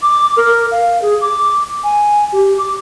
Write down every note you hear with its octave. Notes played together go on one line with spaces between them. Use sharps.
D6
A#4
F5
G#4
D6
G#5
G4
D6